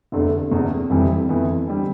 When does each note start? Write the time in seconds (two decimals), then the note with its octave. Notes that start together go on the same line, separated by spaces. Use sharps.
0.12 F1 E2 D3 A3
0.51 E1 E2 C3
0.90 F1 F2 E3 G3 C4
1.29 F2 E3 B3
1.68 D3 G3 C4